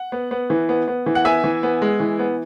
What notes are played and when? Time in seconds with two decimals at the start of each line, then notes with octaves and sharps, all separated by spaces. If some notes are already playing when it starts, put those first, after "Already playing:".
Already playing: F#5
0.12 B3
0.31 B3
0.50 E3
0.69 B3
0.88 B3
1.06 E3
1.15 F#5
1.25 B3 E5 G#5
1.44 E3
1.63 B3
1.82 G#3
2.00 E3
2.19 B3